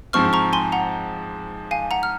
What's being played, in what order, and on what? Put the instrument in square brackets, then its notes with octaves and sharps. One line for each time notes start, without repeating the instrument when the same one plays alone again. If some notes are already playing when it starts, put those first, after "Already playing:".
[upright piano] G#2 F3 C4 [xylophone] C#6 F6
[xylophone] A#5 C#6
G#5 C6
F#5 A#5
F5 G#5
F#5 A#5
F6